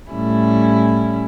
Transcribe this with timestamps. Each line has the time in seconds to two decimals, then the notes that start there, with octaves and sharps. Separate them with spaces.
0.11 A2 G3 C#4 E4